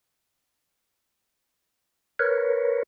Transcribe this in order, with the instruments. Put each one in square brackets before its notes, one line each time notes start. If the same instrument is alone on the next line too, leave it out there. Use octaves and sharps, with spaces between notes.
[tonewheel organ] A#4 B4 C#5